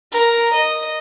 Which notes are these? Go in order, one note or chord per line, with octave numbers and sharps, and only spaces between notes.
A#4
D#5